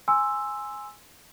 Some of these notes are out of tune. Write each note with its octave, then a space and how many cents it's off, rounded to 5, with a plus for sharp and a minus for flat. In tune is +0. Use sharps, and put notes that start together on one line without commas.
G#5 +0 C6 +5 E6 +0